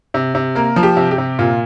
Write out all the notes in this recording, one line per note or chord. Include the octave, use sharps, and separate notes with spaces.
C3
C3
A#3 A#4
F3
G4
C3
G4
C3
A#2 F4